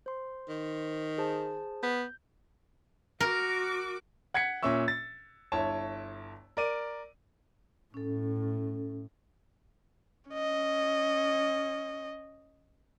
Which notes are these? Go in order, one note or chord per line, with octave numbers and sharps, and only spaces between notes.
C5 C6
D#3
G#4 C5 A5
B3 G6
F#4 A#4 D6
F#5 G#6 B6 C#7
A#2 C#4 E5 C#6 E6
A6
G1 E4 C#5 A5
A#4 D5 D#7
A2 C#4 A4
C#4 D#5